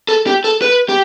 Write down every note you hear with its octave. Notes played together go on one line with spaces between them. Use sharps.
A4
G4
A4
B4
G4